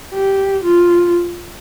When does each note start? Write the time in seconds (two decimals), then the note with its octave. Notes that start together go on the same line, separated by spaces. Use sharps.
0.14 G4
0.65 F4